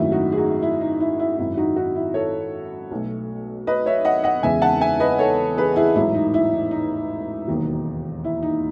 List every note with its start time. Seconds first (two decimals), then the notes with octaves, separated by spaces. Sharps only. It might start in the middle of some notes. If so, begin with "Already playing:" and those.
Already playing: G#1 F#2 D#3 F#3 A3 E4
0.12 D#4 F#4
0.32 G#4
0.37 D#4 F#4
0.62 E4
0.81 D#4
1.00 E4
1.19 E4
1.38 G#1 F#2 D#3 E4
1.57 D#4 F#4
1.76 D#4 F#4
1.96 E4
2.14 A4 C#5
2.91 B1 B2 A3
3.67 B4 D#5
3.86 C#5 E5
4.05 D#5 F#5
4.24 D#5 F#5
4.43 E2 C#3 G#3 E5 G#5
4.62 F#5 A5
4.81 E5 G#5
5.00 B4 D#5
5.19 A4 C#5
5.57 G#4 B4
5.76 E4 G#4
5.95 A1 G#2 F#3 A3 E4
6.15 D#4
6.34 E4
6.53 D#4
6.71 D#4
7.48 E1 D#2 D#3 F#3
8.24 E4
8.43 D#4